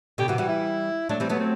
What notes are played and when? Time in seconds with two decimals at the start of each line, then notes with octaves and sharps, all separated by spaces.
0.18 B2 D3 G4
0.28 C3 E3 F#4
0.38 E3 G3 F#4
0.49 E4
1.09 F#3 A3 D4
1.20 E3 G3 C4
1.29 F#3 A3 B3
1.39 C4